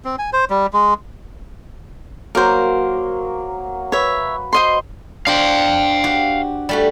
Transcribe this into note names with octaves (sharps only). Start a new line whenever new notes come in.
C4
G#5
C5
G3
G#3
F#3 A#3 A#4 C5
B4 C#5 E5
C5 D#5 C6
D4 C5 F5 G5
F#4 G4
G3 A3 F#4